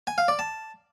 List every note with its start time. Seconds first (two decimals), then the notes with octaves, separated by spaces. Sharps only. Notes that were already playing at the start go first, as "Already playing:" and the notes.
0.07 G#5
0.18 F5
0.28 D5
0.39 A5